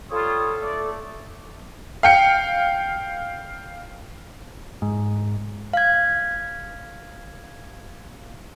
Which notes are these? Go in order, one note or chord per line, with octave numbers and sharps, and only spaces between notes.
G3 F4 A4 C#5 D#6
A3 D5
F5 G5 C#7
G#2
F5 G#6